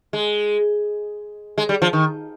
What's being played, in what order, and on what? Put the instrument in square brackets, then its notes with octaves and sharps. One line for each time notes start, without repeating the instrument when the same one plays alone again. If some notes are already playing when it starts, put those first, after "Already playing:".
[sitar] G#3
G#3
G3
F3
D#3